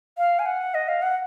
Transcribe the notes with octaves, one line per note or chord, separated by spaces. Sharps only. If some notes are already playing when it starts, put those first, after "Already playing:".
F5
G#5
F#5
D#5
F5
F#5